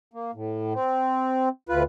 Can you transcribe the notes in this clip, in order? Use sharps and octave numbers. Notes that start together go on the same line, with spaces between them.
A#3
A2
C4
D2 F4 B4